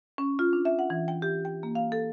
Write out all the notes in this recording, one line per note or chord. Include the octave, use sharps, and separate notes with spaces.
C#4
F4
D4
E5
F#5
E3
G5
G4
G5
A#3
F5
A4